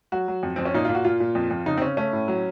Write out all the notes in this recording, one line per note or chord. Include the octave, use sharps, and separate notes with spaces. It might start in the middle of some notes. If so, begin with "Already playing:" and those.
F#3 F#4
F#3
F2
F2 C4
C#4
A#2 D#4
F4
A#2
F#4
A#2 F4
A#2
F2
F2
C#3 D#4
C4
C#3 C#4
A3 C#4
A2
F#3